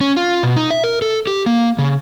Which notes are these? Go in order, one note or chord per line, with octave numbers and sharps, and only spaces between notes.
C#4
F4
B2
D#4
E5
A#4
A4
G4
A#3
C#3